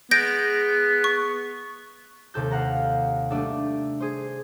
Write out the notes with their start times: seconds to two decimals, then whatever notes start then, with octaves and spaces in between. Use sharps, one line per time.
0.11 G#3 B3 G6 A#6 D7
1.04 C#6
2.34 D#2 C3 A4 G6
2.51 F5 F#5 A#5
3.31 G3 A3 D4 A4
4.00 G#4 C5